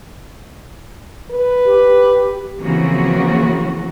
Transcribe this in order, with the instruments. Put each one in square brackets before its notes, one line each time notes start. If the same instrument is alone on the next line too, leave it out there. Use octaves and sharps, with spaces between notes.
[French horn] B4
[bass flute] G4
[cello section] C#3 E3 F3 A#3 C4 F#4